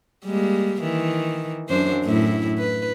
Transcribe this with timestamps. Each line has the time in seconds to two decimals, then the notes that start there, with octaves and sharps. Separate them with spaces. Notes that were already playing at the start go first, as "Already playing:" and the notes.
0.25 G3 G#3 A#3
0.81 D#3 E3
1.69 F#2 D4 C5
2.04 F#2 A2 E4
2.59 B4